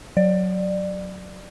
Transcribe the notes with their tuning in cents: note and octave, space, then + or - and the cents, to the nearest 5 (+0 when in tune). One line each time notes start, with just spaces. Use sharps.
F#3 +0 D5 +20